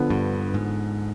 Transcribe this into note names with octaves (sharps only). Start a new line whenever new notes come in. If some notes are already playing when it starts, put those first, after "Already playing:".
Already playing: D3 F3 B3
G2
G#2